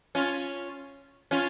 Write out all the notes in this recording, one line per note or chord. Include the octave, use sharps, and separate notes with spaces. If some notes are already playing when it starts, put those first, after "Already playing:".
C#4 F4
C#4 F4